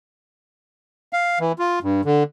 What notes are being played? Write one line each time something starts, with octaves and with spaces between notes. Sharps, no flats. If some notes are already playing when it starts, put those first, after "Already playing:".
F5
E3
F4
G2
D3